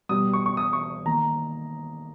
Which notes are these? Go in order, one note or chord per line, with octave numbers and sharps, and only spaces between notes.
B2 G3 B3 D#6
C#6
C#6
D#6
C#6
D#3 A#3 A#5